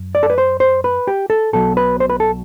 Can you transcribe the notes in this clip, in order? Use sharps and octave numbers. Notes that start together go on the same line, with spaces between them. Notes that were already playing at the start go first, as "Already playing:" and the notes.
Already playing: F#2
D5
A4
B4
C5
C5
B4
G4
A4
B1 B2 F#3 A4
B4
C5
B4
A4